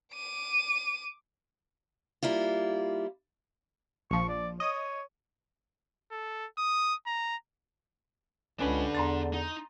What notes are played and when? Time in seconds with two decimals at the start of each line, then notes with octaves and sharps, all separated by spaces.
0.14 D6 D#7
2.23 G3 A#3 E4 F4
4.11 A#1 F3 C#6
4.29 D5
4.60 C#5 D#5 D#6
6.11 A4
6.58 D#6
7.07 A#5
8.60 C#2 D3 C#4 D4 B4 B5
8.95 E2 A#5 C6 A6
9.33 D#4